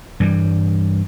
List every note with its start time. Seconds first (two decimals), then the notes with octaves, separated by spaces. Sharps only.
0.20 G2 E3 G3